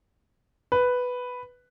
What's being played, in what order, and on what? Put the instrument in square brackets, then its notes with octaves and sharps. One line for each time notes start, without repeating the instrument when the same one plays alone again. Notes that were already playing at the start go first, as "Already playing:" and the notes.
[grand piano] B4